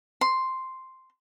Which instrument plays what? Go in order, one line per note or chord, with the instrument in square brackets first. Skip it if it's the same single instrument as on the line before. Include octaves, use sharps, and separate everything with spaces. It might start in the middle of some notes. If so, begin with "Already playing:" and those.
[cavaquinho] C6